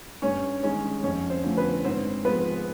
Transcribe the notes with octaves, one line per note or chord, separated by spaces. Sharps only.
G2 C#4 C#5
D#3 G#3 C#4 C#5
F2 C#4 C#5
C4 C5
D3 F3 A3
B3 B4
G#2 C4 C5
F3 G#3 B3 B4